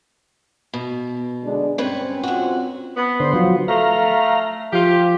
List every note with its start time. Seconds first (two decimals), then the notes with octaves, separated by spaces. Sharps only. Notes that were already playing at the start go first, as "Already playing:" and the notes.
0.74 B2
1.44 D3 G#3 D4
1.78 G2 C4 C#4 B4 C#5
2.23 F2 F#4
2.96 B3
3.20 D3 C5
3.33 F3 F#3
3.68 A3 F5 A#5
4.73 F3 F4 G4